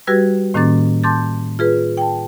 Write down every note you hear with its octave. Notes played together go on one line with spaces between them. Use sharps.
G3 F#4 G4 B4 E6 G#6
A2 D#3 A#3 C#4 D6 A6
A5 C6 D6 G6 A6
F4 G#4 B4
G5 A5